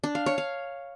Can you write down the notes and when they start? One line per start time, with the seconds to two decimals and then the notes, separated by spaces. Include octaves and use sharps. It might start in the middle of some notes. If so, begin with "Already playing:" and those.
0.04 D4
0.15 F5
0.26 C#5
0.38 F5